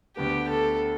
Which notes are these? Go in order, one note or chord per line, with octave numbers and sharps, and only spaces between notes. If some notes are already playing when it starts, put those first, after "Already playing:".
D2 D3 B3 D4 G4
A4